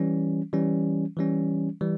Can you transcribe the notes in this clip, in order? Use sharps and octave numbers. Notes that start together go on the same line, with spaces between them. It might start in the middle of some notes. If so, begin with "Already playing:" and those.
Already playing: E3 G3 C#4
E3 G3 C#4
E3 G3 C#4
E3 G3